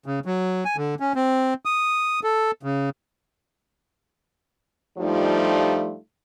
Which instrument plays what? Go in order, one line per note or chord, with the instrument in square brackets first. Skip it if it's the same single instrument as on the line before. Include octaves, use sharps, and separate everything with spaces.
[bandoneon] C#3
F#3
G#5
D3
C#4
C4
D#6
A4
C#3
[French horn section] G2 F3 G3 A3 D#4 F4